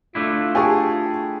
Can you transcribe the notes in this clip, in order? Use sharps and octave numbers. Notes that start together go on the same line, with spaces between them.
A3 D4 E4 F4
G4 G#4 G#5 A5 C#6